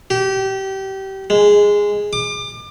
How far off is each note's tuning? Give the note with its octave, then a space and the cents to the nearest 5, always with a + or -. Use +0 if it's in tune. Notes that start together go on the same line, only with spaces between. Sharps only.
G4 -25
G#3 -10
D6 +30